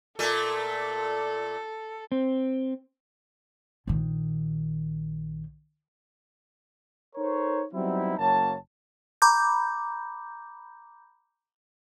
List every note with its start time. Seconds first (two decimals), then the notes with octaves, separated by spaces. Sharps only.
0.19 A#2 A3 A4
2.12 C4
3.87 A#1 D#3
7.15 D#4 A4 A#4 C5 C#5
7.73 F#3 G3 B3 C4 D#4 E4
8.17 F#1 F#2 F#3 A#3 C#5 A5
9.22 A#5 B5 D6 G6